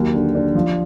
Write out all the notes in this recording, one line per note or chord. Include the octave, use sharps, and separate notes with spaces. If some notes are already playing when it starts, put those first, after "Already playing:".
Already playing: D#2 F#3
D3
D4
F3